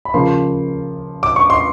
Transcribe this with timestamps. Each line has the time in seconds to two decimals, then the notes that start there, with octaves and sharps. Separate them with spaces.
0.05 B5
0.14 C#3 F3 A#3 C6
1.23 D6
1.36 C#6
1.50 C6